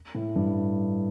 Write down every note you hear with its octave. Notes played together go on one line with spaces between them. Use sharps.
A2
G2